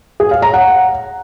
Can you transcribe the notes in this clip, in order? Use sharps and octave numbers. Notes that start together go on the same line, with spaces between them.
G#4
F5
A#5
F#5